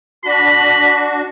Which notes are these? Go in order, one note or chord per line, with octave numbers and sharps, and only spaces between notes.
D4 F#4 B5